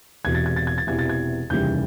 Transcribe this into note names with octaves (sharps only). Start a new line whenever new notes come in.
E1 E2 C3 E3 G#6
A6
G#6
A6
G#6
A6
E1 E2 C3 E3 G#6
A6
G#6
F1 D#2 C#3 E3 G3 G6